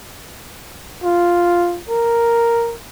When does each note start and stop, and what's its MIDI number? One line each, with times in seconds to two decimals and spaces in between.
1.04 1.79 65
1.89 2.75 70